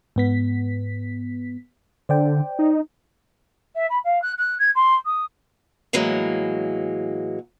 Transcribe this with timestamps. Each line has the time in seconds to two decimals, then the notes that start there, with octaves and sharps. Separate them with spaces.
0.16 G#2 B3 B6
2.09 D3 C5 D5 G5
2.59 D#4
3.75 E5
3.90 B5
4.04 F5
4.22 F#6
4.38 F#6
4.59 G#6
4.75 C6
5.05 D#6
5.93 A2 E3 F#3 G#3 A#3